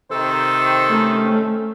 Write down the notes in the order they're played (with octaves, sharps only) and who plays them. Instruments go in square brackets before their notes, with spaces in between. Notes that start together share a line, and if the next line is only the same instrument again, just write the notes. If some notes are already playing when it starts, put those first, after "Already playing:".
[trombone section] C3 D#3 C5 [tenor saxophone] A4
[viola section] A3 C#4